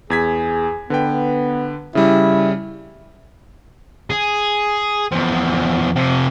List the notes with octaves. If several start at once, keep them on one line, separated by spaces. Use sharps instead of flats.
E2 G#4 G#6 B6
D3 B3 B4 G5
C#3 G3 E4
G#4
E2 F3
C3 F3